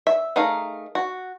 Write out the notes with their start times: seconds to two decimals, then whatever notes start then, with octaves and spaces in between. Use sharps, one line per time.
0.07 E5
0.36 A3 D#4 G#4 A#4 F5
0.95 F#4